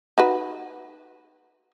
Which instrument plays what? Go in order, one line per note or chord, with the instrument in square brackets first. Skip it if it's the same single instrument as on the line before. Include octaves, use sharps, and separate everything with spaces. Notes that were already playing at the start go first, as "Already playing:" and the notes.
[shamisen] D#4 F#4 B4